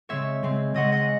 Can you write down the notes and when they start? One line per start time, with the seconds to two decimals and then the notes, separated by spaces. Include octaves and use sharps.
0.09 C#3 G#3 C4 C#5 E5
0.43 C#3 G#3 C4
0.74 C#3 G#3 C4 D#5 F#5
0.92 D#5 F#5